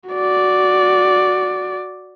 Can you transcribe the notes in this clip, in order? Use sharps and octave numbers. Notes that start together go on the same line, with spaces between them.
F#4 D5